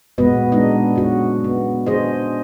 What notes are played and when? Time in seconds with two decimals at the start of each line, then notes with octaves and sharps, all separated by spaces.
0.18 A#2 G#3 B3 F#4 B4 D#5
0.52 G#3 B3 D4 D#4 D#5
0.95 C#4 F#4
1.44 B3
1.87 D4 G#4 C5 D#5